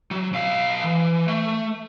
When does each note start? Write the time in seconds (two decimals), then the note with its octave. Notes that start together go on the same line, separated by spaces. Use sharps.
0.11 F#3
0.33 B1 F5
0.84 E3
1.28 A3